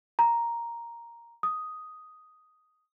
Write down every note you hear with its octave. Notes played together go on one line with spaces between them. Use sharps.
A#5
D#6